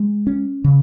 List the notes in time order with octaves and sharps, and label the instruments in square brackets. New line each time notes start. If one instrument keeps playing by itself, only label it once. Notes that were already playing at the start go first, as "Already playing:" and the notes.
Already playing: [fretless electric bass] G#3
C#4
C#3